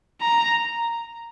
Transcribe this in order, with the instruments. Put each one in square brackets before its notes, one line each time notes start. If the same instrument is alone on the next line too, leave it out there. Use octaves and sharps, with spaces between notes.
[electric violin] A#5